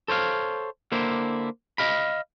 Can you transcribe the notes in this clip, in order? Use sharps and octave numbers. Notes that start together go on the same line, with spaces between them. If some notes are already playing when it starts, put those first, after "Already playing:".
A4 C5 C#5 F5
D3 A#3 E4 C5
D#5 F5 B5